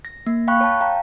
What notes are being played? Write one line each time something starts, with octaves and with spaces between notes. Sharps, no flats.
A#6
A#3
F5 G5 B5 C#6 F#6
C#5 A5
F5 G5 A#5